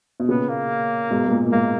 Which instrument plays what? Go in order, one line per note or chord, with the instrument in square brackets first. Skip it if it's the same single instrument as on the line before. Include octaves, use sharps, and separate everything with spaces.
[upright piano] B2
[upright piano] A#2 C#3 [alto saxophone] B3
[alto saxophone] A#3
[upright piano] G#2 B2
G#2
A#2
A#2
[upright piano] G#2 [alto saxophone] A#3